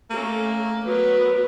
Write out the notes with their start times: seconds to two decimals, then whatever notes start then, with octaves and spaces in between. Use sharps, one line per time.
0.10 A3 A#3 C#4 A4
0.85 F#3 B3 A#4 B4